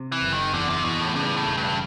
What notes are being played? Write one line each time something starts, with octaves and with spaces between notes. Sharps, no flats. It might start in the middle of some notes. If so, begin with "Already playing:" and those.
Already playing: C3
E3
F#1
D#3
E2 D3
C3
E2 B2
A2
G2 C#3
A2
E1
G2